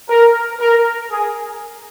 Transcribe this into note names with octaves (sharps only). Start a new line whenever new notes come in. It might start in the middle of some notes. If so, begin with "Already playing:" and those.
A#4
A#4
G#4